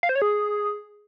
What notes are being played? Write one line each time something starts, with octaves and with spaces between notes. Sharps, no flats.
F5
C5
C#5
G#4